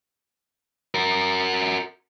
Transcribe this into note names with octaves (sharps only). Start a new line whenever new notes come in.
F#4 A#4